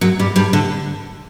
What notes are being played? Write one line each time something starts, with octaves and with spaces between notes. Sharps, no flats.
F#2 F#3
G2 G3
G2 G3
D3